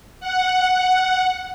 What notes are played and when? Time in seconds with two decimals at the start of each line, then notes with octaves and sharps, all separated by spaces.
0.20 F#5